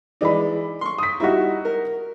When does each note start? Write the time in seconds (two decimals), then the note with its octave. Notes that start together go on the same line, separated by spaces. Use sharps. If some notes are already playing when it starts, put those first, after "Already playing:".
0.21 E3 G#3 D#4 D5 B5
0.81 C6 C#6
0.98 D#6 B6
1.20 G3 D#4 E4 F#4
1.65 A#4